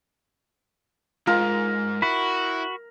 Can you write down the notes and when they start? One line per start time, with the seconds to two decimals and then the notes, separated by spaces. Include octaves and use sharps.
1.27 G#2 F4 A#4
2.02 E4 F#4 B5